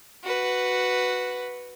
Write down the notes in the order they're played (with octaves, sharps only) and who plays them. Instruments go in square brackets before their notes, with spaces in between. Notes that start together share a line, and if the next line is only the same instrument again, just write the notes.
[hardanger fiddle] F#4 B4